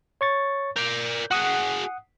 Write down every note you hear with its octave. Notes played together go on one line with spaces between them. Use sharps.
C#5 C#6 A6
A#4 D5 G6
F#4 G#4 F#5 D#6